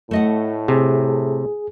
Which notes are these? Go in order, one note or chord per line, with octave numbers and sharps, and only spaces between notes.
A2 A3 D#5 F#5
C3 G#4